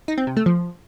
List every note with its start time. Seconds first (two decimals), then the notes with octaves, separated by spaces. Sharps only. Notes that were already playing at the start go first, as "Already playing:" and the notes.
0.08 D#4
0.18 C4
0.27 C3
0.37 A3
0.46 F3